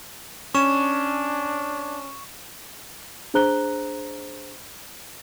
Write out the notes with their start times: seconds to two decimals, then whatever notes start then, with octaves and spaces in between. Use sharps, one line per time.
0.55 C#4 D4 C#6 E7
3.34 D4 G#4 C5 A#5 F#6 G7